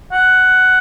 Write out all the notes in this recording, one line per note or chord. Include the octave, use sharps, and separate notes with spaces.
F#5